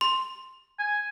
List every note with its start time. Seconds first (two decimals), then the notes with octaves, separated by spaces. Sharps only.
0.01 C6
0.79 G#5